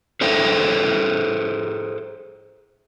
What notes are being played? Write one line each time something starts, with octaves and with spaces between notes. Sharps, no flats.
G#4 A4 C5 E5 G5